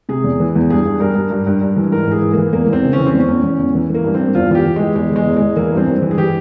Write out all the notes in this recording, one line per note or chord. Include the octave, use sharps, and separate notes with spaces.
C3 G#4
E2
E3
E2
G2 G#4
G2
G2 A#4
G2
G2
G2
G2
E3
G#2 A#4
E3 G#4
E3
E3 A#3
E2 A#3
E2
C4
C#3
C#4
E3
C4
E2
C#4
E2
E2
E2
E3
E3 A#3
G2
C4
G2
E2 F4
E3 F4 G4
E3
E3 G#3
E2 G#3
E3 G#3
E2
E2 G#3
E3 A#3
G2 C4
G2
E3
G#4
E3 G4